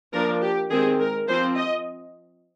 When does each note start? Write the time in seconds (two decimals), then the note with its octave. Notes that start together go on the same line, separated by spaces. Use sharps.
0.13 F3 A#3 D4 A#4
0.42 G4
0.70 D#3 G#3 C4 G#4
0.99 A#4
1.28 F3 C4 C5
1.57 D#5